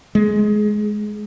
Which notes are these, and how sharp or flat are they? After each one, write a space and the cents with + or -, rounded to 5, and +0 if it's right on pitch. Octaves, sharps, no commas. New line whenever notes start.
G#3 +15